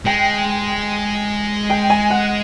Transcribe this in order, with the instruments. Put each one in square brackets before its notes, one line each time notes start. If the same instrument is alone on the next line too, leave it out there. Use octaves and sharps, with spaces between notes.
[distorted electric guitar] G#3 [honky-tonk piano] G5
[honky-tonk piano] G5
G#5
F#5